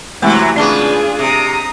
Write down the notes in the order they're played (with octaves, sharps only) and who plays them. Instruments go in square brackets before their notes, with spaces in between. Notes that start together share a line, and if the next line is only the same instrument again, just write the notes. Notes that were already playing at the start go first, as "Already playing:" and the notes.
[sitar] C3 F#3 [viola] E3 [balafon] G#3 A3
[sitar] C#3 B3 [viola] D4 G#4 [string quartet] F4 [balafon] D5 A5 D6
[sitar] C3 [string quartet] A#5 D#6